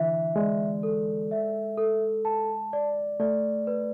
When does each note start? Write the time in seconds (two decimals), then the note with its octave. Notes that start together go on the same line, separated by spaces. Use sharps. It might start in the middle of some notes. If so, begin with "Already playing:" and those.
Already playing: D3 E3 E5
0.36 G#3 D5
0.83 A4
1.31 E5
1.78 A4
2.25 A5
2.73 D5
3.20 A3 D5
3.67 B4